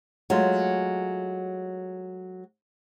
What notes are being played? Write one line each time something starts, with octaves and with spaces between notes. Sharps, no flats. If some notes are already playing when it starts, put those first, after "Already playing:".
F#3 G#3 A3 F4